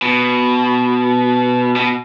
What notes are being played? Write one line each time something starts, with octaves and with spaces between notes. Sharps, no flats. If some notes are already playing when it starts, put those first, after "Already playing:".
B2
B2